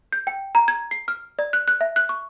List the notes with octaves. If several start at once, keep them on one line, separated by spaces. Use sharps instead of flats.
G6
G5
A#5
G#6
C7
F6
D5
F#6
F#6
E5
F#6
C#6